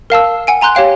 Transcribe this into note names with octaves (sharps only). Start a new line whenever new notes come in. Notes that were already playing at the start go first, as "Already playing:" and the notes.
A#4 F5 A5 E6
F#5 G#5 D7
G#5 A#5 C6 F#6 G6
G4 C#5 F5 G5